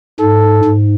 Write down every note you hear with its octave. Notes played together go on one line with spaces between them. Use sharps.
G#2 A4
G#2